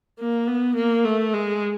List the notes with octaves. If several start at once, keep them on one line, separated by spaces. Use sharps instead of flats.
A#3
B3
A#3
A3
G#3